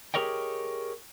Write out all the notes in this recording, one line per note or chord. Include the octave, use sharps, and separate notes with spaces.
G4 G#4 A#4 C#5 D#5 G5